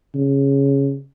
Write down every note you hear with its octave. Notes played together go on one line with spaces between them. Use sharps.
C#3